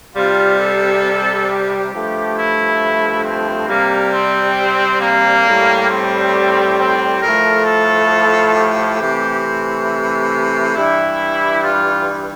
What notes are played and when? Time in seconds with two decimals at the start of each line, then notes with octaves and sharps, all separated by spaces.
0.15 C3 G3 F4
0.60 A4
1.48 G4
1.92 G2 F3 A3
2.36 E4
3.24 C4
3.69 C3 G3 A#3
4.13 C4
5.01 A#3
5.45 A2 G3
5.89 C4
6.78 C4
7.21 A2 F3 A3 A#4
7.65 A4
8.54 G4
8.98 C3 E3 A3
9.43 C4
10.74 G2 E3 G3 E4
11.63 F4